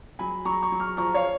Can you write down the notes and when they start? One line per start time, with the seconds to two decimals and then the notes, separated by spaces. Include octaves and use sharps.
0.19 F#3 G#5 B5
0.45 F#3 A#5 C#6
0.62 A#5 C#6
0.72 F#3
0.80 C#6 F6
0.97 F3 A#5 C#6
1.14 C#5 F5